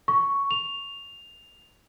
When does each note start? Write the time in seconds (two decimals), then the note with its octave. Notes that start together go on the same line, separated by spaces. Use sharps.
0.08 C#6
0.51 F7